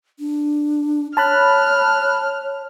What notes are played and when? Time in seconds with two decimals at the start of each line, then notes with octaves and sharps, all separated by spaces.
0.19 D4
1.17 C#5 A5 B5 F6 F#6